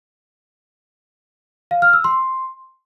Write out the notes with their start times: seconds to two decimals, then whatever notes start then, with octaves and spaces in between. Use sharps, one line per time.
1.71 F5
1.82 F6
1.93 E6
2.04 C6